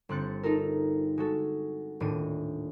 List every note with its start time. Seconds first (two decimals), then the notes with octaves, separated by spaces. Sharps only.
0.09 G1 C4 F#6 A6 C#7
0.43 D#4 F4 A4 A#4
1.18 G#3 F#4 A4
2.00 D#1 A2 D4 D#7